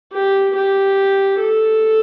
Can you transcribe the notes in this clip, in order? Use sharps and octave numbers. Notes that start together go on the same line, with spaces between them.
G4
G4
A4